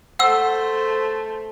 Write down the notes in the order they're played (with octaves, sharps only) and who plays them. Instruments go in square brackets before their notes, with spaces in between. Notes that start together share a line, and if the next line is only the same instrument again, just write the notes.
[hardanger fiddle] A3 C5 [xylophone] F#5 E6